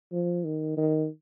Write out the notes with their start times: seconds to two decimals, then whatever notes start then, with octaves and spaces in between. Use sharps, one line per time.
0.12 F3
0.44 D#3
0.77 D#3